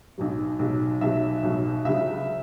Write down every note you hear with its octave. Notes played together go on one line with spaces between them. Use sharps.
B1 B2 F#3
B1 B2 F#3
B1 B2 F#3 E5
B1 B2 F#3
C#2 C#3 F#3 E5